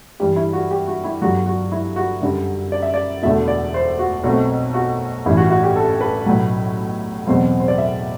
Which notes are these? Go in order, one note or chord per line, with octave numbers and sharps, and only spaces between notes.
G2 E3 G3 G4
E4
F#4
G4
F#4
E4
G1 G2 F#3 F#4
F#4
E4
F#4
F#2 D3 G3
D5
E5
D5
E1 E2 D3 A3 E5
D5
C5
F#4
B1 B2 A3 C4 F#4
F#4
A1 G2 E3 E4
F#4
F#4
G4
A4
B4
B1 A2 F#3
E2 B2 F#3 C4 C5
C5
D5
E5